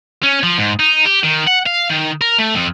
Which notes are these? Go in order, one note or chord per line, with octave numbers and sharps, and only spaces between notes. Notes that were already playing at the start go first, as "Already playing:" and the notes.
C#4
F3
G#2
D#4
G4
D#3
F#5
F5
D#3
A#4
A3
F2